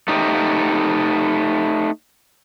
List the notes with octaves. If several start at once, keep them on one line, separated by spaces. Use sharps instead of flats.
A3 D#4 G4